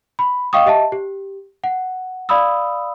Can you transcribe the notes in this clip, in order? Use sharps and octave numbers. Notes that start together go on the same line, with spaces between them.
B5
D#5 F5 G5 C#6 D#6
G4 D#5 E5 A5
G4
F#5
D5 F5 B5 D#6 E6